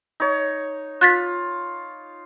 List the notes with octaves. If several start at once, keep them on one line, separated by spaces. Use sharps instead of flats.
D#4 C#5
F4 F#6 A6 B6